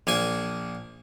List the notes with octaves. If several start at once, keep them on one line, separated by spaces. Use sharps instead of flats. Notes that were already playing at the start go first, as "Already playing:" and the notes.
A#1 A#3 G#5